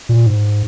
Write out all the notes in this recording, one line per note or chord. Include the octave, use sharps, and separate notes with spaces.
A#2
G#2